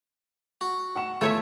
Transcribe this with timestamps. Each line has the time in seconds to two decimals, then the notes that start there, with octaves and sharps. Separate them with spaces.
0.61 F#4
0.95 F#5 C#6 E7
1.21 E2 A3 F4 C#5 E5